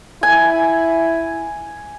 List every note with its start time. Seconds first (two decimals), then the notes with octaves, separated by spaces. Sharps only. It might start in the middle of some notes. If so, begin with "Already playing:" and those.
0.23 E4 G#5